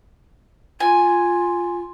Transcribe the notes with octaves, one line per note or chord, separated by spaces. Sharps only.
F4 G#5